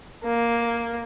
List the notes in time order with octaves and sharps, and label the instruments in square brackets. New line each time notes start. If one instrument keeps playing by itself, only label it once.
[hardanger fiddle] A#3